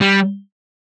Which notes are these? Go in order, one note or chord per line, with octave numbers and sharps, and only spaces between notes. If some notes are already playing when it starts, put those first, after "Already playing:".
G3